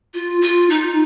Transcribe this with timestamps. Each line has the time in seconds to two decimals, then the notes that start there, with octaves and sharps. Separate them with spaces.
0.14 F4
0.42 F4
0.70 D#4